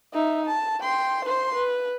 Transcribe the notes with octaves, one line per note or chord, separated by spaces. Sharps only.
D#4 E5
A5
G5 C6
C5 C6
B4